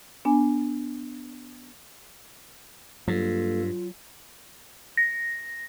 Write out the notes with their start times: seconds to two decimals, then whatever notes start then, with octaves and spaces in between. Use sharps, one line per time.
0.25 B3 D4 G#5
3.08 G2 F#3 A#3 F4 A4
4.97 A#6